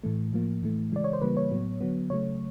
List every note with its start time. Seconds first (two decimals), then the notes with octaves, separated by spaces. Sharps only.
0.04 A2 E3 A3
0.33 A2 F3 A#3
0.62 A2 E3 A3
0.92 C#3 E3 G#3 D5
1.04 C#5
1.13 C5
1.21 C#3 E3 G3 A#3 B4
1.37 C#5
1.51 A2 F#3 B3
1.81 D3 F#3 B3
2.10 C#3 F#3 A3 C#5